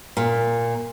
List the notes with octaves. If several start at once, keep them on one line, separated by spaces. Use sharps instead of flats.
A#2